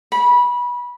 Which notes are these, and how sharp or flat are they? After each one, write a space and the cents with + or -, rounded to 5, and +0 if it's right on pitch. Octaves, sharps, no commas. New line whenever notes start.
B5 -20